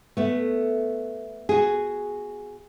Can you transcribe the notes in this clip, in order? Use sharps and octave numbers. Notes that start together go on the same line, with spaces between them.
A3 B3
F#4 G#4